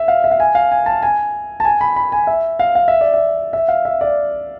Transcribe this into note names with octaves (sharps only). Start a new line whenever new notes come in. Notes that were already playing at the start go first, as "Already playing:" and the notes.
Already playing: E5
F5
E5
F5
G#5
F5
G#5
A5
G#5
A5
G#5
B5
B5
G#5
E5
F5
F5
E5
D5
E5
E5
F5
E5
D5